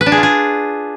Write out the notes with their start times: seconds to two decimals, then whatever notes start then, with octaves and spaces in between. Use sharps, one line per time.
0.01 B4
0.06 D4
0.12 G#4
0.17 F4
0.23 G#4